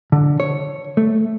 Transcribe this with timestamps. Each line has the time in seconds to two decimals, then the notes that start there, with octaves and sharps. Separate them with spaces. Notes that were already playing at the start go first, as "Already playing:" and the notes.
0.12 D3
0.40 C#5
0.97 A3